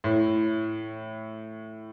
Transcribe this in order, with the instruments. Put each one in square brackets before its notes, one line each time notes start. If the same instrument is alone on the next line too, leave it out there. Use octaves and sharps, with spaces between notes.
[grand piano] A2